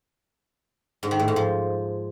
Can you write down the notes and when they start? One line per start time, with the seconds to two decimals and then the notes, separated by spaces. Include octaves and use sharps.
1.03 G#2
1.11 D#3
1.19 A2
1.28 G#2
1.36 F3